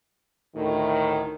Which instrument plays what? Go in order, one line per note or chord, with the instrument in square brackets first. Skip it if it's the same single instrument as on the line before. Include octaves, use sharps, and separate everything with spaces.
[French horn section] D2 A2 D#3